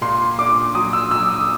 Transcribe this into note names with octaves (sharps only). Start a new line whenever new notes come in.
A#2 C6
A#2 D6
F#3 D#6
E6
F#3 E6
D#6